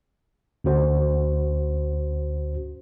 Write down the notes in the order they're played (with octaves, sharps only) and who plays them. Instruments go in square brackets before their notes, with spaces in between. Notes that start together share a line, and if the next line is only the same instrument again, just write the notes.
[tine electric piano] D2 C#4 F#4 C5